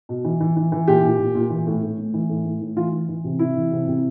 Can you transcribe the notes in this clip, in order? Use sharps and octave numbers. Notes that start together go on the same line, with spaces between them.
B2
E3
E3
E3
E3
A#2 G4
A#2
A#2
A#2
E3
A2
A2
A2
E3
A2
A2
A2
E3 F4
E3
E3
C3
C3 E4
E3
C3
C3